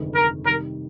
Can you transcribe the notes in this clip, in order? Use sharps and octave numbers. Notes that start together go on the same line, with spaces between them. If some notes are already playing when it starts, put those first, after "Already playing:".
Already playing: G1 F2 C3 D#3 G#3
A#4
C3 D#3 G3 A#4